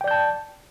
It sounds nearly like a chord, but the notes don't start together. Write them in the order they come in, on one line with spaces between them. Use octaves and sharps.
G5 D5 G6 A5